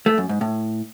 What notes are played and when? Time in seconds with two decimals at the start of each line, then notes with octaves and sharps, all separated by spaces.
0.06 A3
0.18 F#2
0.29 G#2
0.41 A2